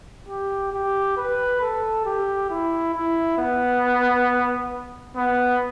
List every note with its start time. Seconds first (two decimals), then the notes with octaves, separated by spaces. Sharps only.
0.28 G4
0.73 G4
1.17 B4
1.61 A4
2.06 G4
2.50 E4
2.94 E4
3.38 B3
5.16 B3